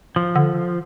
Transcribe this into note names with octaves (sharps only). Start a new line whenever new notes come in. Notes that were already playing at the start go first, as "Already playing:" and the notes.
F3
D3